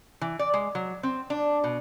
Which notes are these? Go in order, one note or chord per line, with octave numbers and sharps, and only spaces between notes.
E3
D5
G#3
F#3
C4
D4
B2